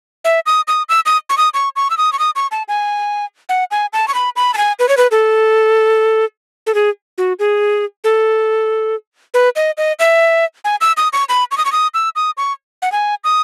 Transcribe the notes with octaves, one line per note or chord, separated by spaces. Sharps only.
E5
D#6
D#6
E6
D#6
C#6
D#6
C#6
C#6
E6
D#6
C#6
D#6
C#6
A5
G#5
F#5
G#5
A5
C#6
B5
B5
A5
G#5
B4
C#5
B4
A4
A4
G#4
F#4
G#4
A4
B4
D#5
D#5
E5
G#5
E6
D#6
C#6
B5
C#6
D#6
C#6
D#6
E6
D#6
C#6
F#5
G#5
D#6